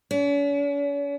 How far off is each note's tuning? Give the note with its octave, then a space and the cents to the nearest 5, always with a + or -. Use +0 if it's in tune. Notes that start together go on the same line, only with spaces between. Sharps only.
C#4 +45